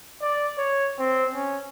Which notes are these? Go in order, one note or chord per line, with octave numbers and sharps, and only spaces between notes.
D5
C#5
C4
C#4